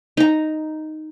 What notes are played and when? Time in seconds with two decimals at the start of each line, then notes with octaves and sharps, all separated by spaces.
0.17 D#4 A#5